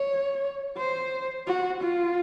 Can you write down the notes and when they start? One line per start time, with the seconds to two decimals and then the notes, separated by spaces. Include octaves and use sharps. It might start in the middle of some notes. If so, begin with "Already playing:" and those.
Already playing: C#5
0.78 C5
1.47 F#4
1.81 F4